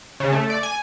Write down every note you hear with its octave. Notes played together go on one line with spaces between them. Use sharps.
C#3
A3
D5
G#5